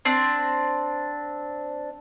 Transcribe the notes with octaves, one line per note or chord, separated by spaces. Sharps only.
C4 D4